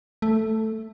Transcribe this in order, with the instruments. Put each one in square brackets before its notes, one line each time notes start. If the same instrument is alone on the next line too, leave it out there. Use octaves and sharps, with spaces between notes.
[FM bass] A3